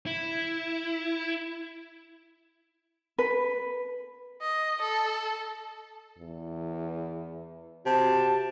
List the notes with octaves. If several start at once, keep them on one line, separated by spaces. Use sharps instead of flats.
E4
B4
D#5
A4
E2
C3 F#4 A5